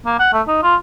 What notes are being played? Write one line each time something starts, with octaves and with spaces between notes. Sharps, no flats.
A#3
F#5
A3
D#4
F4